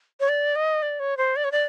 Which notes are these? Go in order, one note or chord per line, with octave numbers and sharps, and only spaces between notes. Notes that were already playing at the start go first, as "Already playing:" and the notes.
C#5
D5
D#5
D5
C#5
C5
D5
C#5
D5